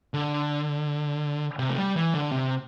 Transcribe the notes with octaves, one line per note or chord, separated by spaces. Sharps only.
D3
C3
A3
G3
E3
D3
C3